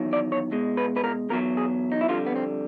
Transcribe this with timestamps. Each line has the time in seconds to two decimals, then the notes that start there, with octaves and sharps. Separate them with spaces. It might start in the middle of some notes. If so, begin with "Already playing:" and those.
Already playing: E2 D#3 F#3
0.13 D5
0.32 C#5
0.52 B2 G#3
0.77 B4
0.96 B4
1.04 A#4
1.29 E2 B2 F#3 A#4
1.57 G#4
1.92 D#4
2.01 E4
2.08 F2 D3 G3 F4
2.26 B3
2.36 C4